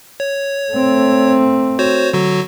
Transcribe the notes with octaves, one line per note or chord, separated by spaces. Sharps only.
C#5
A3 C4
F#4 C5 C#5
D3 F#3 F#4